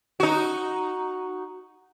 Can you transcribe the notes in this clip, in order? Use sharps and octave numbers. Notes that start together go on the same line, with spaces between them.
D#4 F#4